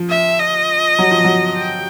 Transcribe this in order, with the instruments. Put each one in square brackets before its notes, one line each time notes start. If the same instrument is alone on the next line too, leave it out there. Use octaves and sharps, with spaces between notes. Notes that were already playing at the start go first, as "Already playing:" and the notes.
Already playing: [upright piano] F3
[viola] E5
D#5
[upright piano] F#3
F3
F#3
[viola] G5